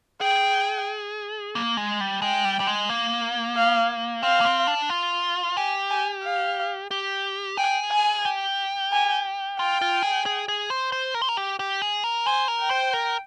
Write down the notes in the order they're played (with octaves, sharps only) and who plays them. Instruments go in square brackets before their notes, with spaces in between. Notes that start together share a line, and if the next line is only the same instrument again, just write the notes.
[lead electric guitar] G#4 [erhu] G5
[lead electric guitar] A#3
G#3
G3
[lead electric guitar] G#3 [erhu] G5
[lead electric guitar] G3
G3
G#3
A#3
[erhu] F5
[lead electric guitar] C4 [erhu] F5
[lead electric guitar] A#3
C4
D4
F4
[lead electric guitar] G4 [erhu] G#5
[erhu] G#5
F5
[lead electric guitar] G4
[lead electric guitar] G#4 [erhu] G5
[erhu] G#5
[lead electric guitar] G4
[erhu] G#5
[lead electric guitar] F4 [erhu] G5
[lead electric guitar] F4
G#4
G#4
G#4
C5
C5
A#4
C5
A#4
G4
G4
G#4
A#4
[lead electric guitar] C5 [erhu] G#5
[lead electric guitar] A#4
[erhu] G5
[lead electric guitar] C5
A#4